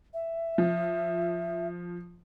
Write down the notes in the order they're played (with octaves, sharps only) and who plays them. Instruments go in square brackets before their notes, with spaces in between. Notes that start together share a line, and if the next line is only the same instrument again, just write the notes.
[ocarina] E5
[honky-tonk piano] F3